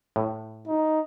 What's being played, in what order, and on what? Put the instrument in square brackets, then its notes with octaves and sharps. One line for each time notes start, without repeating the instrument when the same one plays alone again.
[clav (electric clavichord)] A2
[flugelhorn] D#4